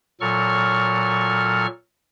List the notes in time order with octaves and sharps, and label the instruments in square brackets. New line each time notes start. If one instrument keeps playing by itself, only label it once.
[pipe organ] A#2 F#3 A4 C#6 F6